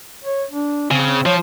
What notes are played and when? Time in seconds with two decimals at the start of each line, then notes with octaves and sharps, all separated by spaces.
0.24 C#5
0.51 D4
0.91 C#3 C4
1.26 F3 C#5